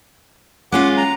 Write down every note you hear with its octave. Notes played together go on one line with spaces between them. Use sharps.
G#3 C#4 F4 F#5 D6
A#5